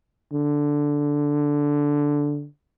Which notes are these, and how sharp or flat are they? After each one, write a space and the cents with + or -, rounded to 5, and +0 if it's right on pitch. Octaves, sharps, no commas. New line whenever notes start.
D3 -5